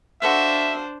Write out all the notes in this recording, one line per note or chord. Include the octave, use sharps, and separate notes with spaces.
D4 F#4 A4 C5 E5 F5